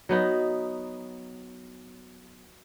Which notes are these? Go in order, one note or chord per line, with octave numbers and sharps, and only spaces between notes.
F#3 B3 D#4